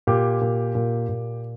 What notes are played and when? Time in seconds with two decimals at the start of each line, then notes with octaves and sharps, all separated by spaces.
0.07 A#2 G4
0.41 A#2
0.75 A#2
1.09 A#2